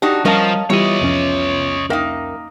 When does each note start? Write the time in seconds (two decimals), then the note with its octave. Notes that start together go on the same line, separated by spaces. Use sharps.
0.02 D4 D#4 F#4 G4
0.25 F3 G3 C#4 A#4 D#5 F5 A5
0.70 E3 G3 B3 E4 F4 G4 C#5 D#5
1.01 C2 F2 C#4
1.90 A#3 D#4 A#4 E5 G5